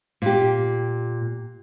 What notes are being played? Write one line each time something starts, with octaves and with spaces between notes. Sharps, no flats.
A#2 G4